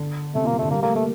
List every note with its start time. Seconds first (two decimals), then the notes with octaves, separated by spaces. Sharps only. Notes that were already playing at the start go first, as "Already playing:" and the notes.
Already playing: D3
0.35 C3 A3
0.44 A#2 A#3
0.53 C3
0.59 A3
0.62 D3
0.71 G3 A#3
0.83 A3 A#3
0.95 A3 A#3